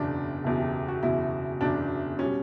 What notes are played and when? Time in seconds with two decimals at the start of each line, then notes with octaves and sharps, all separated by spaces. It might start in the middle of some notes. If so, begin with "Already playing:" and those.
Already playing: F#1 E2 B2 D4
0.44 F#1 E2 B2 E4
0.59 G4
0.88 F#4
1.03 F#1 E2 B2 E4
1.61 F#1 E2 B2 D4
2.19 B2 G3 C#4